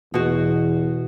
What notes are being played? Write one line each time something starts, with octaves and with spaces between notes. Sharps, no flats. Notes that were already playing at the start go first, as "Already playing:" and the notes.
E2 B2 F#4